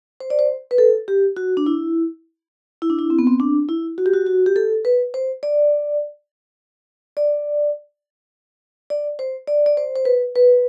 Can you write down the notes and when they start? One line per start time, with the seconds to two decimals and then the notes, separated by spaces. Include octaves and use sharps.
0.20 C5
0.30 D5
0.39 C5
0.71 B4
0.78 A4
1.08 G4
1.37 F#4
1.57 D4
1.66 E4
2.82 E4
2.90 D4
2.99 E4
3.10 C4
3.19 B3
3.27 C4
3.40 D4
3.69 E4
3.98 F#4
4.06 G4
4.13 F#4
4.26 F#4
4.46 G4
4.56 A4
4.85 B4
5.14 C5
5.43 D5
7.17 D5
8.90 D5
9.19 C5
9.47 D5
9.66 D5
9.77 C5
9.96 C5
10.05 B4
10.35 B4